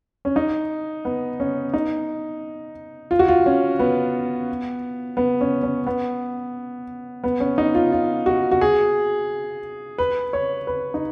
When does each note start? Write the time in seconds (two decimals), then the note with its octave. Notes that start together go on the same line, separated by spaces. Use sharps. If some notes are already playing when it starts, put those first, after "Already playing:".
0.25 C#4
0.36 D#4
1.05 B3
1.40 C#4
1.73 D#4
3.11 F4
3.19 F#4
3.28 F4
3.46 C#4
3.79 B3
5.17 B3
5.41 C#4
5.63 C#4
5.87 B3
7.24 B3
7.40 C#4
7.58 D#4
7.75 F4
7.92 F4
8.26 F#4
8.51 F#4
8.61 G#4
9.98 B4
10.33 C#5
10.67 B4
10.94 D#4